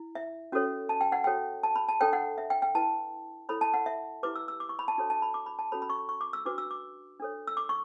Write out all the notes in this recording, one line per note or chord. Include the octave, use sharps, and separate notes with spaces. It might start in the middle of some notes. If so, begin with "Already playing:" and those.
Already playing: E4
E5
C#4 F#4 A4 C#5
A5
G5
F#5
F#4 A4 C#5 G5
A5
B5
A5
D4 A4 C#5 G5
F#5
E5
G5
G5
E4 B4 A5
E4 A4 C#5 B5
A5
F#5
E5
E4 G4 B4 D6
E6
E6
D6
C#6
B5
A5
D4 F#4 A4 C#5
A5
B5
D6
B5
A5
C#4 F#4 A4 C#5 B5
B5
C#6
C#6
D6
E6
D4 F#4 B4 D6
E6
D6
D4 A4 C#5
E6
D6
C#6